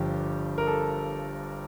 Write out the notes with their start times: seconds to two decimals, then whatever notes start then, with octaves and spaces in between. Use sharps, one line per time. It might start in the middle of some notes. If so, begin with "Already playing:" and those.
Already playing: G1 G2 F3 G4
0.58 A#4
0.67 A4